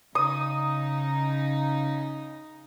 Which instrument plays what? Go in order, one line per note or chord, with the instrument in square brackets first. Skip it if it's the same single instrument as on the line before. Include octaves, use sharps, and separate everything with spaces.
[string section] C#3 D#4 [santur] D#6